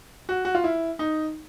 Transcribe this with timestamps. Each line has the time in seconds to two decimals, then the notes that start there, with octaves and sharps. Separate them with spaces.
0.29 F#4
0.45 F#4
0.55 F4
0.64 E4
0.99 D#4